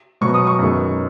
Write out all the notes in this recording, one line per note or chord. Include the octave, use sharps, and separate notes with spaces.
B2 F#3 B3 C#6
D#6
C#6
F#2 D#3 G#3 B3